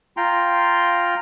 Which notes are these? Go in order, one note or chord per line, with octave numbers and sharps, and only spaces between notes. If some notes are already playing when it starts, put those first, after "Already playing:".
F4 G5 A#5 C6